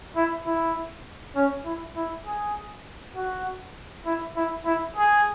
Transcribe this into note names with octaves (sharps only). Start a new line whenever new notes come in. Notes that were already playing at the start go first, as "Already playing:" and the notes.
E4
E4
C#4
E4
E4
G#4
F#4
E4
E4
E4
G#4